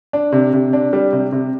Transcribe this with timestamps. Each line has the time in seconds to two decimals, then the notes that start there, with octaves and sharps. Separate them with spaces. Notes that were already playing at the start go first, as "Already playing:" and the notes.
0.13 D4
0.32 C3
0.53 C3
0.73 D4
0.93 G3
1.13 C3
1.32 C3